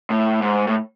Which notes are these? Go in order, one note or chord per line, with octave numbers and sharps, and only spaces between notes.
A2
G#2
A2